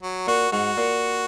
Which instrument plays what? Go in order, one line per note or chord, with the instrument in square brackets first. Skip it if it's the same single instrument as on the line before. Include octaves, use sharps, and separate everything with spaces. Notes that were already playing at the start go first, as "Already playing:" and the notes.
[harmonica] F#3
[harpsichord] A#2 [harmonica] F#4
[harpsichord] G#2 [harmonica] F#4
[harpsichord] A#2